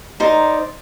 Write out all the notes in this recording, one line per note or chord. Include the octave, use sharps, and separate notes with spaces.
D#4 A#4 C5 D5